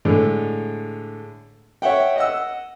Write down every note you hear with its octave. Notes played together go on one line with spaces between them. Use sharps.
A2 D3 G#3
C#5 E5 F#5 G5
D#5 F#5 E6